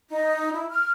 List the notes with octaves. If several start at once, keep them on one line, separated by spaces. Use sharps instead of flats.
D#4
E4
F6